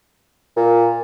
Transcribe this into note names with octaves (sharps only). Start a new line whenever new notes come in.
A#2